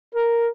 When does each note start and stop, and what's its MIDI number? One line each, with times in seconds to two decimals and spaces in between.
0.14 0.46 70